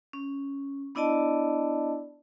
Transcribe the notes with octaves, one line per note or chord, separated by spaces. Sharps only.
C#4
B3 D4 E4 D5 D#5 A5